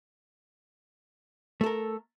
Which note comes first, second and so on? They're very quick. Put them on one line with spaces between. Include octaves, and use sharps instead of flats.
A3 A4 A#4